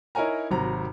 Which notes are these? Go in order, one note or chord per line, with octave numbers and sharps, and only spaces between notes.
D#4 E4 A#4 C#5 G#5 A#5
G#1 C3 F#3 A#5